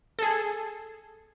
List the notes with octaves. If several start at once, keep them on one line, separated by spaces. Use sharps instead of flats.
G#4 A4